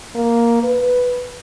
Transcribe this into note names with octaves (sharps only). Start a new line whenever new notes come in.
A#3
B4